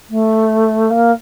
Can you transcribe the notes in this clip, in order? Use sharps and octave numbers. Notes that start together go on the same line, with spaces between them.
A3
A#3